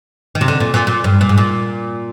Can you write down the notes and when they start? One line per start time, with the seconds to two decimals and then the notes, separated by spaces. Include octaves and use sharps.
0.35 D#3
0.41 C3
0.48 D3
0.60 A#2
0.74 A#2
0.87 A#2
1.04 G2
1.21 A#2
1.29 G#2
1.37 A#2